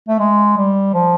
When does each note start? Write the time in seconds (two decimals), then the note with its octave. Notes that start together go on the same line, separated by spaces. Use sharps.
0.09 A3
0.19 G#3
0.57 G3
0.94 F3